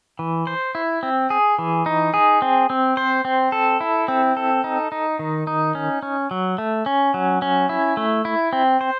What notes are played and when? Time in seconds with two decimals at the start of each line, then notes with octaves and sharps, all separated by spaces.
0.19 E3
0.47 C5
0.75 E4
1.03 C4
1.30 G#4
1.59 E3
1.86 D#4
2.14 G#4
2.42 C4
2.70 C4
2.97 C5
3.25 C4
3.52 A4
3.81 E4
4.08 C4
4.37 A4
4.64 D#4
4.92 D#4
5.19 D#3
5.47 D#4
5.75 C#4
6.03 C#4
6.31 F#3
6.58 A3
6.86 C#4
7.14 F#3
7.42 C#4
7.69 E4
7.97 A3
8.25 E4
8.53 C4
8.81 C5